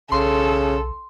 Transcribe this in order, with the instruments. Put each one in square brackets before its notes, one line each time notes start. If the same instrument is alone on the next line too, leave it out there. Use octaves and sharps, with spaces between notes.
[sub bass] B1 [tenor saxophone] C#3 [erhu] A4 [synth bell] C6